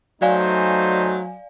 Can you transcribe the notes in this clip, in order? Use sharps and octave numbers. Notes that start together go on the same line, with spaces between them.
F#3 A3 D#4 C5 D5 F5 G#5